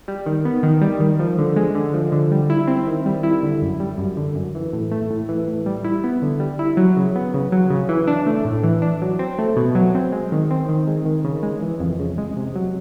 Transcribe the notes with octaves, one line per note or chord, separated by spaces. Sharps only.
G3
D#3
B3
D#3
G3
D#3
F3
D3
G#3
D3
F3
D3
G3
E4
C4
D#3
G3
E4
D3
F#2
G3
F#2
D3
F#2
E3
A2
A3
A2
E3
A2
G3
E4
B3
D3
G3
E4
F#3
C#3
B3
C#3
F#3
C#3
E3
D4
A3
A2
E3
D4
F#3
C4
A3
B2
F#3
C4
G#3
D#3
C4
D#3
G#3
D#3
C#3
G#3
E3
F2
C#3
G#3
C3
F#3